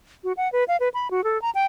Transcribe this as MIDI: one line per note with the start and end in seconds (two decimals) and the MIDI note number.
0.24 0.33 66
0.37 0.51 78
0.52 0.64 71
0.68 0.77 77
0.80 0.89 71
0.94 1.11 83
1.11 1.24 66
1.24 1.40 69
1.42 1.50 82
1.55 1.66 79